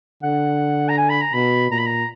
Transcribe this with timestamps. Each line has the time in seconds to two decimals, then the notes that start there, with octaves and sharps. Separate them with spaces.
0.23 D3 F#5
0.89 A#5
0.97 G#5
1.10 B5
1.22 A#5
1.33 B2 B5
1.71 A#2 A#5
1.78 B5
1.86 A#5